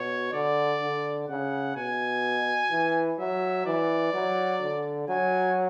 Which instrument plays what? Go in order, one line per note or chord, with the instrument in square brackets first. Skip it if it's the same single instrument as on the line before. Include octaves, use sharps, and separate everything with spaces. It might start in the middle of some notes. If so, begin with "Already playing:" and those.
Already playing: [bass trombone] B2 [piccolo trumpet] C#5
[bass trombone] D3 [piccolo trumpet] D5
[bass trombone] D3
[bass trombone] C#3 [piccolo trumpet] F#5
[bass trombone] B2 [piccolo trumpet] G#5
[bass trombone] E3
[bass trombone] F#3 [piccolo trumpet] E5
[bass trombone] E3 [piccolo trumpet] D5
[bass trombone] F#3
D3
[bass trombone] F#3 [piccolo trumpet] G#5